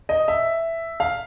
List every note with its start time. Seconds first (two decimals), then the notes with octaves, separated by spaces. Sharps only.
0.09 D#5
0.28 E5
1.00 F5